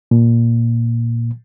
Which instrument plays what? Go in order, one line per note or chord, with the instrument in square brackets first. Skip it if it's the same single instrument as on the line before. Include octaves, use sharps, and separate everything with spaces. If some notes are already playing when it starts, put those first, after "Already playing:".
[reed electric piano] A#2